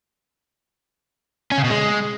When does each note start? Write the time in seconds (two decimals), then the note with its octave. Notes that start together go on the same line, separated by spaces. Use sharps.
1.52 C#4
1.58 C#3
1.64 B2
1.70 G#3